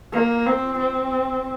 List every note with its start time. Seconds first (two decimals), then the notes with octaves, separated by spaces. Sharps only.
0.12 A#3
0.46 C4
0.79 C4